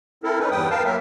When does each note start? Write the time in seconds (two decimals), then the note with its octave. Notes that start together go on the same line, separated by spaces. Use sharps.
0.24 C4 E4 A4 A#4
0.39 C#4 D#4 B4
0.51 E2 G2 G3 B4 G5 D#6
0.70 A#4 B4 F5 G5 A5
0.85 F#3 A#3 A#4 E5